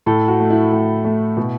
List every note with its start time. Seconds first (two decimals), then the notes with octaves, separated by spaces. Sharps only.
0.06 A2 A4
0.28 F#4
0.40 A3
0.50 E4
0.72 A2
1.05 A3
1.37 B2